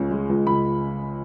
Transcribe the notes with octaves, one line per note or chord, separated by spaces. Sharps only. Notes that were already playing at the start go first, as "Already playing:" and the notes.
Already playing: C#2 C#3
G#3
C#2
C#2 B5